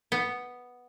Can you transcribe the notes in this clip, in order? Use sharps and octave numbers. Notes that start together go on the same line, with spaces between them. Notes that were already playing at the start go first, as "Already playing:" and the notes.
B3